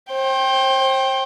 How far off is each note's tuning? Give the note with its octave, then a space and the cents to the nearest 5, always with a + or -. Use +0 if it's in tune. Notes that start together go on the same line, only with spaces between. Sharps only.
C5 +35 G5 +0